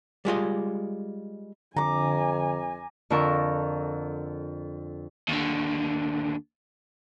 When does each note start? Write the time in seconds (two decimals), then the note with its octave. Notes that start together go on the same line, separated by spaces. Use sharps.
0.25 G3 G#3 F4 D#5
1.76 F2 D3 G#5 A#5 D6
3.10 F2 D3 F4 A#4 C#6 E6
5.28 D#2 D3